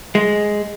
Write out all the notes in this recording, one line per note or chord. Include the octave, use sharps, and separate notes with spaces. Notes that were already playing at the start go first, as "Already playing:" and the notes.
G#3